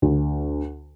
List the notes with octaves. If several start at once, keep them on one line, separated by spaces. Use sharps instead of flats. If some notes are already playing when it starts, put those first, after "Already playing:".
D2